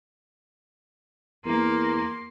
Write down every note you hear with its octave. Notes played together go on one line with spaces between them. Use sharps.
E2 A#3 A#4 C6